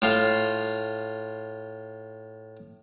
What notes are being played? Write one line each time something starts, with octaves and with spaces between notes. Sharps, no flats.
A2 F4 C6